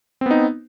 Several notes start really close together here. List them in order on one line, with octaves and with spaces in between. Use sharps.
C4 B3 D#4